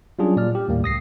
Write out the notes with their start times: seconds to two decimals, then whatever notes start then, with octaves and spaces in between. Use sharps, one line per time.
0.19 F#3 G3 C#4 D4 F4 G#4
0.36 A#2 D5 F6
0.55 G4
0.68 D#2 A2 G3 A#3
0.83 C#2 D#6 A#6 C7